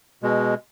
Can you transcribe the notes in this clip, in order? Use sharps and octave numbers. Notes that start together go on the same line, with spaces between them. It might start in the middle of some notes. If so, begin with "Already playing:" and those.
B2 G#3